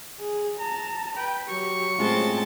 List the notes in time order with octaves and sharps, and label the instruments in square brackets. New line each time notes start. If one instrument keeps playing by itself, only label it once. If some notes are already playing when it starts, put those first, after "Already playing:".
[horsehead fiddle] G#4
A5 A#5
[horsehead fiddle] B4 [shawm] G5
[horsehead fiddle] F#3 G4 [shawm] C#6
[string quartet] A2 C4 A5 [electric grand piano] G#3 C#4 F4